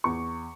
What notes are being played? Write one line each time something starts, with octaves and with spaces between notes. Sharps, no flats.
E2 C#6